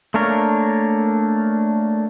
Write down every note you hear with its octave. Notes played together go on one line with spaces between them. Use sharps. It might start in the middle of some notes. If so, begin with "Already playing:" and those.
A3 A#3 D4 A#4 C#5